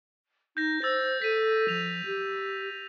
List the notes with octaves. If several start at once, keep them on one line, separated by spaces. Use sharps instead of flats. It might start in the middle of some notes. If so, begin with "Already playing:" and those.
D#4 G6 A#6
C5 E6 A6 A#6
A4 B6 D#7
F3 F7
G4